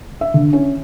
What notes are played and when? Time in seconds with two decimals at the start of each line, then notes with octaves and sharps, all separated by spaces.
0.21 E5
0.34 D3
0.53 C#4